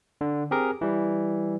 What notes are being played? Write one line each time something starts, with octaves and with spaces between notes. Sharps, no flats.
D3
C4 G4 G#4 A#4
E3 G3